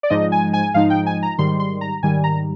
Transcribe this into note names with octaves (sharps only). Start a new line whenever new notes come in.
D5
G#2 F3 G#3 D#4 D#5
G#5
G#5
G#2 F3 G#3 D#4 F5
G5
G#5
A#5
G#2 D#3 G3 C6
C6
A#5
G#2 D#3 G3 G#5
A#5